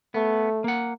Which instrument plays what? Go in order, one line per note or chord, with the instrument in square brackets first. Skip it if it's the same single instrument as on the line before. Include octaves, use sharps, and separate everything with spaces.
[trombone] A3 [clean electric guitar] B3
[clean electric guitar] A#3 F#5